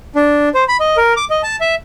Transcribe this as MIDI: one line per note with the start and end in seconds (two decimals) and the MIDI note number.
0.16 0.49 62
0.55 0.64 72
0.68 0.77 83
0.80 0.97 75
0.97 1.14 70
1.17 1.25 86
1.30 1.42 75
1.43 1.56 81
1.61 1.75 76